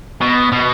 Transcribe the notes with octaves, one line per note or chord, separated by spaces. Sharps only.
B2
B2